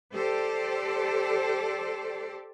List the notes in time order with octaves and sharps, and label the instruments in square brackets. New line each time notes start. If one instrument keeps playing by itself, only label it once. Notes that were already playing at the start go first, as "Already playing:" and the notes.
[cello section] G4 A4 C5 D5